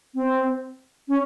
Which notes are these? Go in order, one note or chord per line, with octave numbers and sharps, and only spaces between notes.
C4
C#4